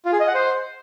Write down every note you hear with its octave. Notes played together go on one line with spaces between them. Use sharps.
F4
G#4
D#5
F#5
C5